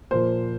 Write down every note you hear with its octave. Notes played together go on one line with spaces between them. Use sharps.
A#2 F3 A#3 C5